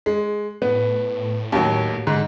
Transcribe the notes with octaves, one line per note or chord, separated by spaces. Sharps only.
G#3
A2 B3
D#2 F#3
G#2 D3